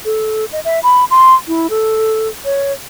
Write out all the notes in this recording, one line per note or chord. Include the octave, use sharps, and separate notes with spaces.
A4
D#5
E5
B5
C6
E4
A4
C#5